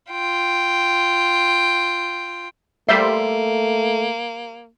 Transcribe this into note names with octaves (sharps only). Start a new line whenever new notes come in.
F4 G5
G3 A3 A#3 C5 E5 C6